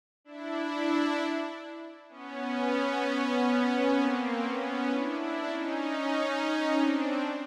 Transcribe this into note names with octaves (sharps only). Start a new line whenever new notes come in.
D4 E4
B3 C#4
A#3 C4
B3 C#4
D4 E4
D4 E4
C#4 D#4
C4 D4